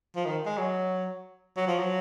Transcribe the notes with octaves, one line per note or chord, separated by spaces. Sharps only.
F3
D#3
G#3
F#3
F#3
F3
F#3